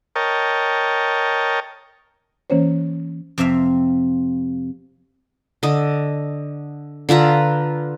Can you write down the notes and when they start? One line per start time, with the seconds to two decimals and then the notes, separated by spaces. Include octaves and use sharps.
0.16 A#4 C#5 D#5 G5 A5
2.50 E3 A#3 C#4 C5 C#5
3.38 F2 C3 C4 E5 F5
5.63 D3 D#5
7.09 D3 F4 B4 A#5